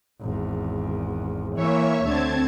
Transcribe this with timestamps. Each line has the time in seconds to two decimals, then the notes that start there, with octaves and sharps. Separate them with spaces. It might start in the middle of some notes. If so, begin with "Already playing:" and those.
0.21 G#1 E2
1.56 E3 A#3 C#5 E5 C#6
2.04 D2 D3 C4 A5 G#6